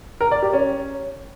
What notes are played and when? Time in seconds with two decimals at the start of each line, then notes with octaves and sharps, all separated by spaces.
0.21 A#4
0.31 D5
0.42 G4
0.53 C#4